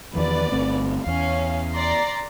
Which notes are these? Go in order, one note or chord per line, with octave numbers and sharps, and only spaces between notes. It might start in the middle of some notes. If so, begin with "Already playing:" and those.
E2 D#3 F3 B4 D5
G1 A3 C4
E2 C#4 F5
D5 A#5 C6